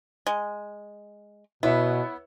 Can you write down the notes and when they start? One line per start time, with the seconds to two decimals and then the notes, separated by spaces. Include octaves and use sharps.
0.27 G#3
1.63 B2 B3 E4 C#5 E5